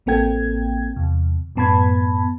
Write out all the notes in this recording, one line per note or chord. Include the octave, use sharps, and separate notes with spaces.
A1 A#3 C4 A4 G5 G#6
E2 C3
F#2 A2 B3 A5 B5 G#6